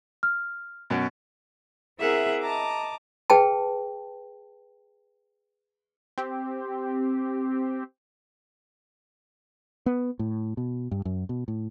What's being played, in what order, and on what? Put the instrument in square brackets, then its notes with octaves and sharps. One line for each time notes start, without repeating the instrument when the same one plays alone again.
[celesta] F6
[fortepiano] F#2 B2
[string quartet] C4 E4 G#4 A#4 E5 F#5
D#5 A5 A#5 D6
[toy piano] G#4 B4 G5 A5
[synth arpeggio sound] C4 G4
[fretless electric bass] B3
A2
B2
G2
F#2
B2
A2